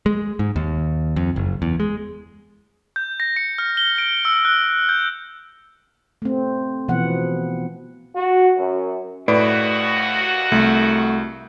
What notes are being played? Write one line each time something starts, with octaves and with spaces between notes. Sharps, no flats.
G#3
G#2
D#2
F2
F#1
E2
G#3
G6
A#6
C#7
F6
G7
D7
E6
F#6
G6
A3 C4
B2 E3 F3 B3 F#5
F#4
F#2
D#2 A2 F#4 B4 D5
C2 A3